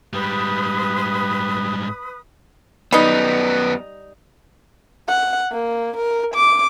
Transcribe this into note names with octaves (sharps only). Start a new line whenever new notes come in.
G#2 G3 B4 D#6
F#2 G3 B3 D#4
F#5
A#3
A#4
D6